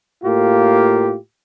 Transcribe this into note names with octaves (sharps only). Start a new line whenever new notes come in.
A2 A#3 F4 G4